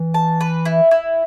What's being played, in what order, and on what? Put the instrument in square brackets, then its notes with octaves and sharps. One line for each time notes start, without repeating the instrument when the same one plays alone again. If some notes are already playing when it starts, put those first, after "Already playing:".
Already playing: [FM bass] E3
[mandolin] A5
B4
E4
E4